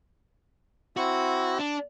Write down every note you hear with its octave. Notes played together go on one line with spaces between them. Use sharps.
C4 E4 F#4
D4